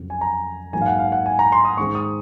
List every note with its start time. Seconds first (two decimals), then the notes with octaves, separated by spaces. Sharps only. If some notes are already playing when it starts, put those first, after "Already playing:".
Already playing: F2 C#3 F#3
0.10 G#5
0.21 A#5
0.73 G#2 F#3 A#3 D#4 G#5
0.81 F5
0.86 F#5
0.99 F5
1.12 F#5
1.26 G#5
1.39 A#5
1.52 C6
1.65 D#6
1.77 G#2 D#3 G#3 C4 C#6
1.95 D#6